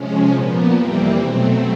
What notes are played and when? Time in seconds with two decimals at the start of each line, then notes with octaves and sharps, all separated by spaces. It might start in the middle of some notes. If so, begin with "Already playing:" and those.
Already playing: C3 F3 G#3 C#4
0.32 A#2 F3 A#3 B3
0.74 F2 C3 E3 G3 A#3 C4
1.18 B2 F#3 A3